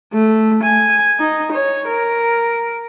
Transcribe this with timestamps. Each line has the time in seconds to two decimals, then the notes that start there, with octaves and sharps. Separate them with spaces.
0.13 A3
0.63 G#5
1.20 D#4
1.52 C#5
1.87 A#4